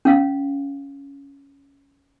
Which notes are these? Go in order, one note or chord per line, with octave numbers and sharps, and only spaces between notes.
C#4 F5